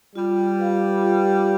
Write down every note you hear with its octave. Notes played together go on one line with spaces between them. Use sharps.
G3 F4
B4 F5
F4